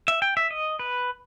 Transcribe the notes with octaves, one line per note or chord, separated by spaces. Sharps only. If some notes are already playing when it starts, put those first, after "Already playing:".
E5
G5
E5
D#5
B4